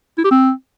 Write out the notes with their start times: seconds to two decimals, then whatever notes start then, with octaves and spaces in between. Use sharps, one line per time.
0.18 E4
0.24 G4
0.31 C4